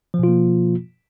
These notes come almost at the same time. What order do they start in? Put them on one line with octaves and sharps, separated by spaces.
F3 B2 F4 A#3